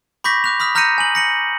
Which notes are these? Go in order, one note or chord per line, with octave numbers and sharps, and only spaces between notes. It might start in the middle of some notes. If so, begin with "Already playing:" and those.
B5 C#6 D6 G6 A#6 B6
D6 F#6 F7
B5 D#6 F6 B6
A#5 F6 G6 A#6 C#7 D#7
G#5 F#7
A#6 C#7 F#7